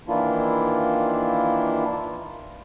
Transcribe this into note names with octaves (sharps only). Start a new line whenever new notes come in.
D#3 E3 A#3 D4 E4 F4